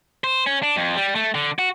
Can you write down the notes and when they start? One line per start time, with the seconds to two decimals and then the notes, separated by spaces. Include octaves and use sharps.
0.24 C5
0.46 C#4
0.63 D4
0.77 F2
0.96 G3
1.15 A3
1.35 D3
1.59 F#4